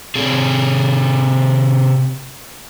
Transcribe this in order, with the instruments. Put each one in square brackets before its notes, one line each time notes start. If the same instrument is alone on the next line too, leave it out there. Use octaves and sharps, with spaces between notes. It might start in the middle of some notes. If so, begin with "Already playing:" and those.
[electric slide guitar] C3 C4 G#4